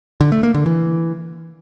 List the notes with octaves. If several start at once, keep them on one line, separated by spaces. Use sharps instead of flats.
D3
A3
A#3
D3
E3